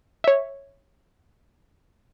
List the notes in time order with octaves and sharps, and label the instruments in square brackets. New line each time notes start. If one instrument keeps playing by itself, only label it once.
[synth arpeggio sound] C#5 E5